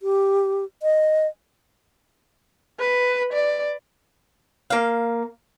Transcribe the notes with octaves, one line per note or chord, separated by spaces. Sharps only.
G4
D#5
B4
D5
A#3 F5